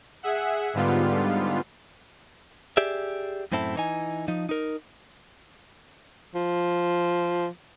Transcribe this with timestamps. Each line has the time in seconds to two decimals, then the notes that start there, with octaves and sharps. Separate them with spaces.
0.23 G#4 E5 F#5
0.74 G#2 D3 G3 B3 F4
2.77 G4 G#4 D5 E5
3.52 F#2 A2 C4 E4 A4
3.76 E3 D#4 G#5
4.28 F3 D#4
4.49 D#4 A#4
6.35 F3